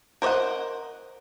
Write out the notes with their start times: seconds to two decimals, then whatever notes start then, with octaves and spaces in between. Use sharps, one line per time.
0.22 A#4 C5 C#5 D#5 F#5